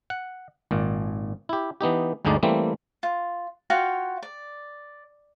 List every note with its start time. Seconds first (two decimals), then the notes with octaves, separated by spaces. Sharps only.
0.10 F#5
0.71 G#1 A#2
1.49 E4 G4
1.81 E3 B3 D#4 G4
2.25 G1 D2 D3 G#3 D#4 D5
2.43 E3 G3 A3 A#3 C4
3.03 F4
3.70 F4 F#4 F5 G5
4.23 D5